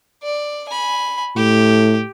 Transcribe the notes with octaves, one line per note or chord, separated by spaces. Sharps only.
D5
G#5 B5
A2 G4